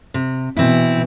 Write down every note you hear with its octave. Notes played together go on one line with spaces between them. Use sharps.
C3
B2 E3 C4 E4